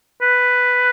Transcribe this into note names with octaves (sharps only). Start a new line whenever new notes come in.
B4